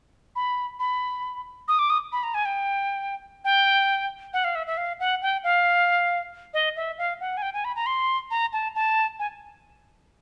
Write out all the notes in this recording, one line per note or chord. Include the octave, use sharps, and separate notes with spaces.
B5
B5
D#6
D6
D#6
B5
A#5
G#5
G5
G5
F#5
F5
E5
E5
F5
F#5
G5
F5
D#5
E5
F5
F#5
G#5
G5
G#5
B5
A#5
C6
A#5
A5
A5
G#5